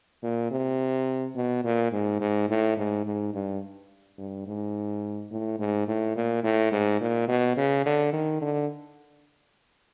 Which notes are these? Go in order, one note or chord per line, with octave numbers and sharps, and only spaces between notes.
A#2
C3
B2
A#2
G#2
G#2
A2
G#2
G#2
G2
G2
G#2
A2
G#2
A2
A#2
A2
G#2
A#2
B2
C#3
D3
D#3
D3